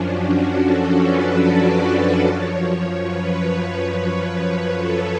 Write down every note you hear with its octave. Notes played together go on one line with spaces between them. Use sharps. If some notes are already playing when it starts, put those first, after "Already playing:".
Already playing: F#2 F3 C#4 D4
F#4
A4
B4
D5
F#2 F3 C#5
B4
A4